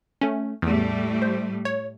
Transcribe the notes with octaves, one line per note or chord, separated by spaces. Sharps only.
A3 C#4
E2 A2 G3 A3
C5
C#5